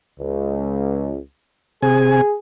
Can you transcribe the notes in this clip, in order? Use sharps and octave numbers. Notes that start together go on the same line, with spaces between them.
C#2
C3 G#4 G#5